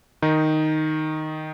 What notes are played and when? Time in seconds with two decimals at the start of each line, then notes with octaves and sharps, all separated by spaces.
0.22 D#3 D#4